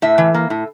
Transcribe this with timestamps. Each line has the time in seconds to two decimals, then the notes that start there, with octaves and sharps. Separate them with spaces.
0.02 A2 E5
0.18 E3
0.34 A#3
0.50 A2